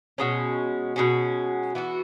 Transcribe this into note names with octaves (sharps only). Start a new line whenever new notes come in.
B2 G#3 C#4
B2 G#3 C#4
E3 B3 F#4